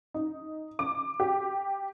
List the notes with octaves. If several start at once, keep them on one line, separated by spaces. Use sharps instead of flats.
D#4
D6
G4